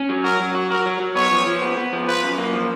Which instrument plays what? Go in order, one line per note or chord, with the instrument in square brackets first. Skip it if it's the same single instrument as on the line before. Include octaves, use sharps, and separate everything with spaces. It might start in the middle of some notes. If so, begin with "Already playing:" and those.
Already playing: [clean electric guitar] C#4
F#3
[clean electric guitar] F#4 [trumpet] A#4
[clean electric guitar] F#3
F#4
[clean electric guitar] F#4 [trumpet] A#4
[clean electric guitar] F#3
F#3
[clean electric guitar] B3 [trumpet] C#5
[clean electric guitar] F3
F3
B3
B3
F3
[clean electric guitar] F4 [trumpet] B4
[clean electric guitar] F#2
A#3
F3